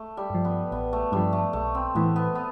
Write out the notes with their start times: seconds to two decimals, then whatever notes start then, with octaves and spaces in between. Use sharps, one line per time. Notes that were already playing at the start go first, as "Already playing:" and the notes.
Already playing: A3
0.17 G3
0.30 G2 F3
0.45 B3
0.72 A1 B3
0.93 A3
1.12 G2 F3 G3
1.33 A3
1.53 B1 A3
1.75 C4
1.95 A2 E3 B3
2.16 B3
2.35 B3